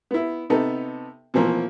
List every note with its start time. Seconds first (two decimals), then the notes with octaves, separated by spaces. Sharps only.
0.11 B3 E4
0.50 C3 B3 D#4 A4
1.34 B2 E3 F3 A#3 C4